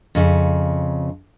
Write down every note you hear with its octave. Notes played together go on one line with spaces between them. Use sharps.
F2 C#3